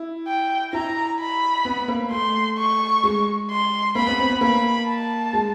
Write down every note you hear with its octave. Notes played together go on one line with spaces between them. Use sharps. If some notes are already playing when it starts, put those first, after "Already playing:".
Already playing: E4
G5
E4 A#5
B5
B3
A#3
A3 C6
C#6
G#3
C6
A#3 B5
B3
C4
B3
A#3 B5
A5
G#3